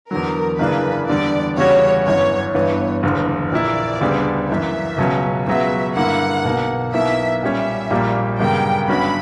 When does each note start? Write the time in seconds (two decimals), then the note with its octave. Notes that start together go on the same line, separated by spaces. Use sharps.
0.11 E2 D3 F#3 A#4
0.59 F#2 C#3 E3 A#3 D4 B4
1.08 E2 D3 G3 D5
1.57 E2 C#3 G3 C#4 F#4 C#5
2.06 G1 F#2 E3 C#5
2.54 G1 G2 E3 B3 C#5
3.03 F#1 E2 D3
3.52 A#1 A#2 A#3 E4 D5
4.01 D2 C#3 G3 B3 D4
4.49 F#2 E3 A#3 E5
4.98 C#2 B2 F#3 C#4
5.47 C#2 C#3 F#3 B3 F#4 E5
5.96 G2 D3 A#3 E4 F#5
6.44 B1 B2 A#3
6.94 B1 B2 A#3 E4 E5
7.42 A#2 G3 C#4 E5
7.90 A#1 A#2 G3 A#3
8.40 G1 F#2 C#3 G3 A#3 G5
8.88 G1 G2 F#3 C#4 F#4 B5